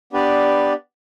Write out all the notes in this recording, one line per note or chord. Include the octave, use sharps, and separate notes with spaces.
B3 D4 G4 B4 D5